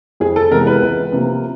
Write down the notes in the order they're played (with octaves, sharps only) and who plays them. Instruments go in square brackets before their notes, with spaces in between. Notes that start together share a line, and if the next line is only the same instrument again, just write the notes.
[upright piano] F2 G#4
A4
C3 E3 G#3 B3 A#4
B4
C#2
C3 F3 A#3